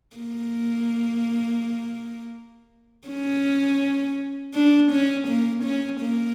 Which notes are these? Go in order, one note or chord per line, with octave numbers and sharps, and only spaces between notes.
A#3
C#4
D4
C#4
A#3
C#4
A#3